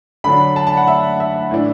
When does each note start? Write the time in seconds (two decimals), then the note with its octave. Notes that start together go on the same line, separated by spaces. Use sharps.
0.24 D3 F#3 D4 B5
0.56 A5
0.67 A5
0.77 F#5
0.88 E5
1.20 E5
1.51 A2 E3 D4